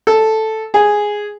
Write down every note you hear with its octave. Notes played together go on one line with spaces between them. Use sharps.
A4
G#4